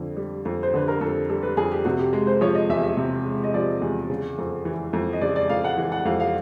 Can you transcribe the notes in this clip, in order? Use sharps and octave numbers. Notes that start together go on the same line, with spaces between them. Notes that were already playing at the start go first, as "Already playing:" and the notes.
Already playing: F2 D3
G3
F2
C5
D3 B4
A#4
F2 A4
G3 A4
B4
F2 G#4
G4
C3 F#4
G4
G#3
C5
F3 C#5
D#5
E2 E5
E5
C3
G#3
D#5
F3 D5
E2
C#3
F2
E3
F2
D#5
C#3 D5
D5
F2 F5
F#5
E3
F#5
F2 F5
F5